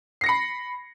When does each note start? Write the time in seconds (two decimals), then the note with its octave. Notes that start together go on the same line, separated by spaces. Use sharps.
0.21 C7
0.24 A#6
0.26 C#7
0.29 B5